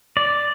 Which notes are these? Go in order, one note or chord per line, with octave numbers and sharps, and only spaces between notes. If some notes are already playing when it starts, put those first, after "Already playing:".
D5